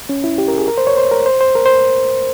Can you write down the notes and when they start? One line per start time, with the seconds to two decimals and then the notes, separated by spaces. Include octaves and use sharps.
0.09 C#4
0.24 E4
0.38 G4
0.48 A#4
0.58 G#4
0.68 A#4
0.78 C5
0.87 C#5
0.97 C5
1.11 A#4
1.26 C5
1.41 C5
1.55 A#4
1.66 C5